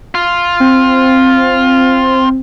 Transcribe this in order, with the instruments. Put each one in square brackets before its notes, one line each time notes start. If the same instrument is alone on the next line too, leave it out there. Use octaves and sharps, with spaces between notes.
[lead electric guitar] F4
[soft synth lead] C4